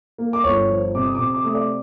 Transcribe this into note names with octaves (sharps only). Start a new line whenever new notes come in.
A#3
D6
G1 C#5 C#6
F3
C3 D6
D#6
C3 D6
D#6
D6
A3 D#6
D5 D6